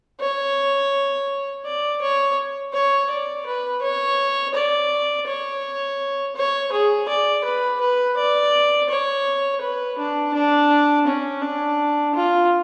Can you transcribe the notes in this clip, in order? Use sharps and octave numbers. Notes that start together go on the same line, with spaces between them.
C#5
D5
C#5
C#5
D5
B4
C#5
D5
C#5
C#5
G#4
D5
B4
B4
D5
C#5
B4
D4
D4
C#4
D4
F4